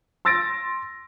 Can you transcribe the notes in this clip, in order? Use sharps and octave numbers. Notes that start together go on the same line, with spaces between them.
C6 E6 A6 A#6 D7